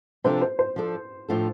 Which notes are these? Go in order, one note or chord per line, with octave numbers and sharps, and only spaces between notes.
C3 F3 D4 F4 A4 C5
C5
C5
F3 D4 A4
A2 F3 D4 F4 A4